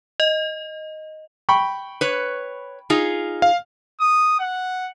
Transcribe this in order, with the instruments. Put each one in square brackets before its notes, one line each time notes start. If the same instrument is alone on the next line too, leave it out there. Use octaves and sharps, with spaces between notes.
[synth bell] D#5
[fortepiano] G5 B5 C#6
[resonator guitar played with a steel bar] B4 C#5
D#4 F4 G#4
[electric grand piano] F5
[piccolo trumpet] D#6
F#5